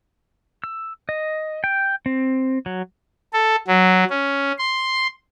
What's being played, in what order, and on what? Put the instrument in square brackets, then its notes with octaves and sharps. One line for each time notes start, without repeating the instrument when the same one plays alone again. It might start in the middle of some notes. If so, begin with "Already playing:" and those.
[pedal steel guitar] E6
D#5
G5
C4
F#3
[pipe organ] A4
F#3
C#4
C6